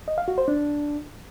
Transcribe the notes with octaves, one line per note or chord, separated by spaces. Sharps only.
D#5
F5
F#4
C5
D4